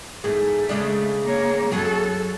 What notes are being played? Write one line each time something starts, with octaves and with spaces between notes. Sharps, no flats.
E2 G#2 A3 G#4
C#3 G#3 D4
A#3 C#5
F#2 F#3 G#4 A4